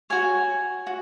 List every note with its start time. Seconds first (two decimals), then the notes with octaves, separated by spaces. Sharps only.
0.10 F#4 C#5 G#5
0.87 F#4